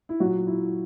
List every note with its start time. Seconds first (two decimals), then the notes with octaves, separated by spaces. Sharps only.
0.09 E4
0.20 A#2 F#3 F#4
0.47 E4